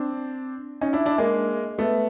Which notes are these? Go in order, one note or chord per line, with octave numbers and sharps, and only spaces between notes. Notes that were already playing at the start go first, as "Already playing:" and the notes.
Already playing: C4 D4
C#4 D#4
D4 E4
D4 E4
G#3 A#3
A3 B3